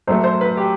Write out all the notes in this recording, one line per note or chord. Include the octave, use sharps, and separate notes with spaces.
F#2 F#3 A3 C5
C5
B4
G4